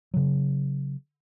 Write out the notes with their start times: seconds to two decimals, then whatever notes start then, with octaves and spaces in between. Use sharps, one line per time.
0.14 C#3 F#3